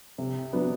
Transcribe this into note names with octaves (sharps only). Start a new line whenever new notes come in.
C3
F#3 B3 D4